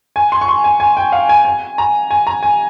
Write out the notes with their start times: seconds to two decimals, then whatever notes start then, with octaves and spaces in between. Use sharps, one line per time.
0.16 G#5
0.32 C6
0.41 C#6
0.48 C6
0.64 G#5
0.80 G#5
0.97 G5
1.12 F5
1.29 G#5
1.45 G#5
1.78 A#5
2.11 G#5
2.27 A#5
2.43 G#5